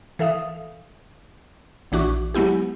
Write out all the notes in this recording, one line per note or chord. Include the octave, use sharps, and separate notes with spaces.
E3 A4 E5 F5 D#6
A#1 E3 D4 F#4 C#6 D6
F#3 G#3 B3 E4 G4